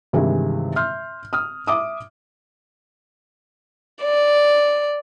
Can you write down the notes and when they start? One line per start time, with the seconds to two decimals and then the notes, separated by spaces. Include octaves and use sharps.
0.13 G2 C3 D#3 E3 G#3 E4
0.76 E5 C6 F6 G6
1.33 D#6 F6
1.67 E5 D6 D#6
4.01 D5